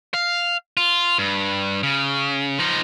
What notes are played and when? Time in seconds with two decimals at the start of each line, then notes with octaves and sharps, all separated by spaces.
0.14 F5
0.77 F4
1.18 G2
1.83 C#3
2.58 F3 D#4